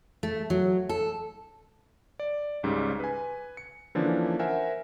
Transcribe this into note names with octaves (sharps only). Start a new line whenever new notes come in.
A3
F#3
A4
D5
C#2 G#2 C#3 G3
B4 G#5
C#7
D3 E3 F3 A#3 C#4 D4
A#4 C5 E5 F#5 G#5